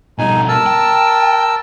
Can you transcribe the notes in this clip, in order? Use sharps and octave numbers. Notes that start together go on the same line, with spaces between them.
B2 G3 D#4 G#5
A#4 A5 E6
G5